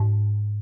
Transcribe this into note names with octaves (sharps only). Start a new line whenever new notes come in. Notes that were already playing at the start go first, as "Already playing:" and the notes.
Already playing: G#2